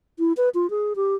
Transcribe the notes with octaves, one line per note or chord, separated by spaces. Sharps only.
E4
B4
F4
G#4
G4